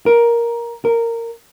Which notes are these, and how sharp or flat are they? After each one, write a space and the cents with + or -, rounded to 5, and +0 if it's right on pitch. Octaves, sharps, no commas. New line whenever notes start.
A#4 +10
A#4 -15